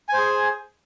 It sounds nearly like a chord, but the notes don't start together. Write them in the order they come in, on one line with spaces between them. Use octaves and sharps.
G#5 C5 G#4